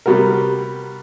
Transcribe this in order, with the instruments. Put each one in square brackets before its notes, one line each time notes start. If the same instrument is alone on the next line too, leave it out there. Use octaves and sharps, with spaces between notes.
[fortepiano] C3 G3 B3 F#4 A#4